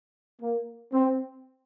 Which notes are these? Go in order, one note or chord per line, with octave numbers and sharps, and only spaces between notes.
A#3
C4